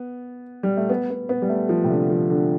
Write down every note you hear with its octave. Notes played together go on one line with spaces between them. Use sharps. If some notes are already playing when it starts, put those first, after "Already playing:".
Already playing: B3
G3
A3
B3
B3
B3
G3
A3
F3
C3
D3
F3
D3